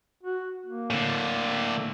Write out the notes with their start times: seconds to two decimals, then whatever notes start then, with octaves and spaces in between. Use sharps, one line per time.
0.23 F#4
0.66 A#3
0.90 A2 D3